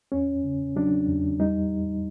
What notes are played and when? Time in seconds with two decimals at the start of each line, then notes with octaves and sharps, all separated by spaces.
0.12 E2 C#4
0.44 C#3
0.76 F#3 D4
1.08 E2
1.40 G3 D#4